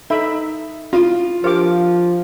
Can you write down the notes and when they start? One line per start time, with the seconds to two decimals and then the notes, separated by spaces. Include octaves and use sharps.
0.10 D#4 A4 D#5 E5 B5
0.93 C#4 E4 F4 F5
1.44 F3 D4 G4 A#4 C5 F5 D6